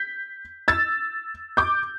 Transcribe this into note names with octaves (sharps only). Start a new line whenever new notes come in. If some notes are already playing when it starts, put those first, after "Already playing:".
Already playing: G6 B6
E6 A6
D6 G6